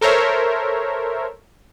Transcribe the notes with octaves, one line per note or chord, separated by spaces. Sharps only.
A4 A#4 C5 C#5 E5